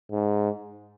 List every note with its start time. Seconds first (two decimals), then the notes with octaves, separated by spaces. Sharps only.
0.11 G#2